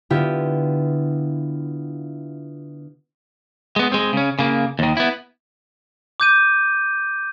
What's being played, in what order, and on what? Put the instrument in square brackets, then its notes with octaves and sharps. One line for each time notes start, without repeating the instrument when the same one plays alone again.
[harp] D3 B3 E4 F4 G4
[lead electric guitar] G#3 B3
G#3 C4
C#3 C#4
C#3 A#3
D#2 D#3
B3 E4
[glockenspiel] D6 G6 D#7